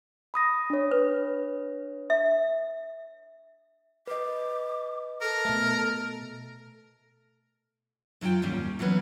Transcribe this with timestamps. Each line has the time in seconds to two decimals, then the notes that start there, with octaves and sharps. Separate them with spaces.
0.34 B5 D#6 A#6
0.70 D4 C#5
0.91 B4
2.10 E5
4.07 B4 D#5 D6
5.22 A4 A#4
5.45 B2 A3
8.21 F#2 F#3 F4 G4 G5
8.42 D#2 G#2 G3 C#4
8.79 E3 F#3 B3 C#4 B4